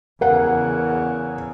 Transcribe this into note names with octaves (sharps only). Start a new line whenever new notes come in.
E2 C#3 A#4 F#5